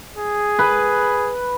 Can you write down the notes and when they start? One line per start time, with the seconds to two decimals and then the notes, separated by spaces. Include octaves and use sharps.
0.17 G#4
0.59 B4